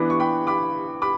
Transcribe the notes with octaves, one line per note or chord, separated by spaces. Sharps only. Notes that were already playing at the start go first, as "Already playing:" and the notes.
Already playing: E3 B3 D4 B5 D6
C#6
G5 B5
B5 D6
B5 D6